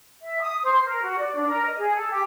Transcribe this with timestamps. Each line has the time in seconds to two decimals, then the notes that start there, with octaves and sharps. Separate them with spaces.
0.20 E5
0.41 D#6
0.63 C5
0.85 A#4
1.01 F#4
1.18 D5
1.35 D4
1.48 A#4
1.65 D#5
1.77 G#4
1.95 A4
2.10 G4